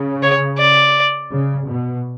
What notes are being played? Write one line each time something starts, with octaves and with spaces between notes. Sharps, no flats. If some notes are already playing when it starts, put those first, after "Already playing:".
Already playing: C#3
C#5
D5
C#3
B2